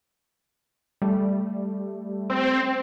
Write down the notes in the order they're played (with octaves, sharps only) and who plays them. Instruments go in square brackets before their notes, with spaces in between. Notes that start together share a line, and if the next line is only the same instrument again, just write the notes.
[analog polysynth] G3 A3
[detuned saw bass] C4